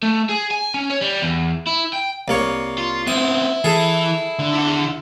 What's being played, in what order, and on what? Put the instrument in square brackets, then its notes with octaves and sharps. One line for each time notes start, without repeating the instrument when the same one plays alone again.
[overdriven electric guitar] A3
G#4
G#5
C#4
C#5
G3
E2
E4
G5
[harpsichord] C2 A#3 C#5
[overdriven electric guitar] F4
[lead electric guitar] B3 C4 [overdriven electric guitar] E4 [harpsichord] D#6
[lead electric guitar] E3 [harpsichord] G#4 A4
[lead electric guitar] D3
[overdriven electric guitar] E4 F#5